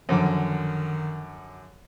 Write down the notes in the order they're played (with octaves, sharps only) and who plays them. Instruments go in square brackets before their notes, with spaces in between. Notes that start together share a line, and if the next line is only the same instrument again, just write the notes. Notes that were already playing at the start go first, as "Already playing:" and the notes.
[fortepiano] F#2 D3 D6 [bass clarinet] D#3 [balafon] F3